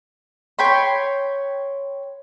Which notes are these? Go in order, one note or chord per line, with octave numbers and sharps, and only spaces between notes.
C#5 G5 B5 C6